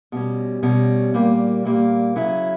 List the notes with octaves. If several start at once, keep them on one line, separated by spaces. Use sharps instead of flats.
B2 G3 C#4
B2 G3 C#4
A#2 G3 A#3
A#2 G3 A#3
C#3 F#3 C#4 E4